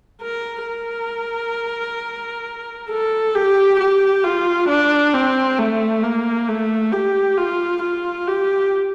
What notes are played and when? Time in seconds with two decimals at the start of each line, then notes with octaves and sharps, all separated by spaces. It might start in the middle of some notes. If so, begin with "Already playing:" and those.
0.22 A#4
0.66 A#4
2.90 A4
3.35 G4
3.80 G4
4.24 F4
4.69 D4
5.14 C4
5.58 A3
6.03 A#3
6.49 A3
6.92 G4
7.38 F4
7.82 F4
8.28 G4